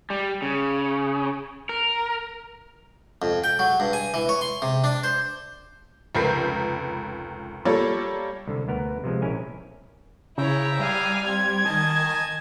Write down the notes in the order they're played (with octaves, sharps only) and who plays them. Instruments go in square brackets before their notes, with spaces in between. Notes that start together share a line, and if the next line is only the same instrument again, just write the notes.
[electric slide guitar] G3
C#3
A#4
[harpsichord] F2
G5
F#3
G2
G#5
E3
C#5
C6
C3
D4
C5
[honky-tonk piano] F1 C#2 A#4 B4 G6 C7
G3 A#3 F4 A4 C#5 D5
[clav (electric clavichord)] C2 D3
D2 B3 A#4
C3 F3 G#3
A#1 C#4 E4 A#4 G#5
[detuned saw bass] C#3 [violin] E4 C#5 [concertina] E5 G5 A#5
[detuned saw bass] G3 [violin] F5 G#5
[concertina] C4 [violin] G#6
[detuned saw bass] D#3 [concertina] D#5 G#5 A5